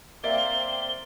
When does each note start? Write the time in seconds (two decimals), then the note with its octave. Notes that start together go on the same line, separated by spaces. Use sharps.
0.24 A#3 C4 C5 D5 E5 G7